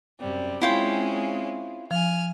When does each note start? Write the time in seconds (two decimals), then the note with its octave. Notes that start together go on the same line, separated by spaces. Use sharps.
0.20 F#2 C3 G3
0.62 G#3 C4 C#4 E4 F4 G5
1.91 F3 G#5 F6